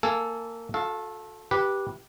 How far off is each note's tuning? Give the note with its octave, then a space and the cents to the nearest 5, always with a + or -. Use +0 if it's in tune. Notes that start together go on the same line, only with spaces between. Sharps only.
A#3 -20 A4 +0 G#5 +0
F#4 -40 A4 -10 F5 +0
G4 +0 B4 -15